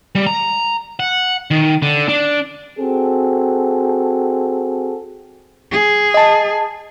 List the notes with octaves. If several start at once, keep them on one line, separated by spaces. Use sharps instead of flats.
G3
A#5
F#5
D#3
D3
D4
C4 F#4 G#4 A4
G#4
D#5 A5